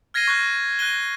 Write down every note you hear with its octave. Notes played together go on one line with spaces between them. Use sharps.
F6 G#6 A#6 C7 D#7 G7
C#6 F#6
F#6 A#6 D#7 G7